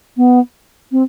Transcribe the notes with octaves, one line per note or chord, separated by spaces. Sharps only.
B3
C4